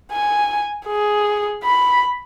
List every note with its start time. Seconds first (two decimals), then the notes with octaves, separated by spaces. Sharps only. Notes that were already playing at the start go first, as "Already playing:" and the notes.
0.12 G#5
0.87 G#4
1.64 B5